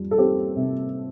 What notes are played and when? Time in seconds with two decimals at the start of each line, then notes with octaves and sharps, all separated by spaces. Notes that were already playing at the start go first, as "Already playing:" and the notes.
Already playing: F2 G3
0.11 A4
0.18 C4 G4
0.56 C3